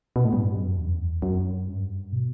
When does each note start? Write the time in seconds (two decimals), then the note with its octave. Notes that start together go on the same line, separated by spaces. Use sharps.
0.16 B2
0.25 A2
0.33 G2
0.55 F#2
0.77 E2
1.22 F#2
1.68 G2
2.12 B2